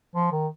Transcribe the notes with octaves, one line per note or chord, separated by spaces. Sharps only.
F3
D#3